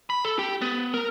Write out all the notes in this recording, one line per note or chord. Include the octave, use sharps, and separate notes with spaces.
B5
A4
G4
B3
A#4